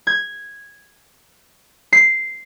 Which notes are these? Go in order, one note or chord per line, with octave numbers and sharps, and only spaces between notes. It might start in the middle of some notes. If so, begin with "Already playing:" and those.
G#6
C7